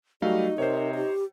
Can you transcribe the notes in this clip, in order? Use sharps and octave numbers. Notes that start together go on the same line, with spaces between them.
F#3 G3 A3 D#4 F#4 F5
C3 A#4 C5 C#5
G4